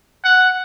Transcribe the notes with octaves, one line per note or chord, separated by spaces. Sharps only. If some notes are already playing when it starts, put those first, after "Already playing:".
F#5